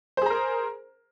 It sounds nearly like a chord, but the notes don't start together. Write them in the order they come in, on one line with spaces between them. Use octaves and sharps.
C5 G#4 A#5 A#4